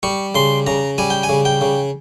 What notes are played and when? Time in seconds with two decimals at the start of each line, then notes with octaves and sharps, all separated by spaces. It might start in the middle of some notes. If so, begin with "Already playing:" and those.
0.03 G3 C#6
0.35 C#3 C6
0.67 C#3 A#5
0.98 G3 G#5
1.10 G5
1.23 G#5
1.29 C#3
1.45 G5
1.61 C#3